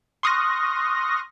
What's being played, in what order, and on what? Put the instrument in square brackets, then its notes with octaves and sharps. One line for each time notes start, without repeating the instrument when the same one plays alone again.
[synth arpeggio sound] C6 C#6 D#6 F6 F#6 A#6